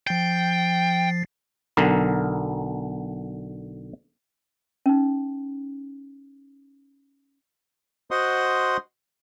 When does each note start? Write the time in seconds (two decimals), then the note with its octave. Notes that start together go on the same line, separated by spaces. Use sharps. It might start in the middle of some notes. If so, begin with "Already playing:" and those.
0.07 F3 G5 A6 C7
1.77 B1 D3 A#4
4.86 C#4 D#4
8.11 F#4 C5 D#5 F#5 C6 D#6